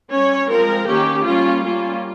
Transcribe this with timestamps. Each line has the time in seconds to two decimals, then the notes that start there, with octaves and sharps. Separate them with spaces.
0.11 G3 C#4 C#5
0.49 F3 G#3 C4 A#4
0.87 D#3 A#3 C#4 G4
1.26 G3 A#3 C#4 F4
1.64 G3 A#3 C#4 F4